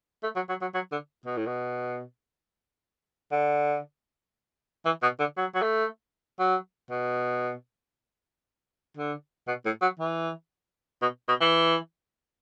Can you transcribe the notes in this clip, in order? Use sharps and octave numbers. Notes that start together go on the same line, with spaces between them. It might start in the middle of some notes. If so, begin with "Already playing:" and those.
A3
F#3
F#3
F#3
F#3
D3
B2
A2
B2
D3
E3
B2
D3
F#3
F#3
A3
F#3
B2
D3
B2
A2
F#3
E3
B2
B2
E3